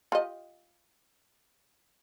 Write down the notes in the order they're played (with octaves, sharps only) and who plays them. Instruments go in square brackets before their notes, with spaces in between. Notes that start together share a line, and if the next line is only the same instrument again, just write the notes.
[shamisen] F4 G4 D#5